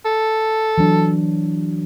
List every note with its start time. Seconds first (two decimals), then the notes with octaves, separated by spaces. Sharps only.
0.05 A4
0.78 E3 F#3 D4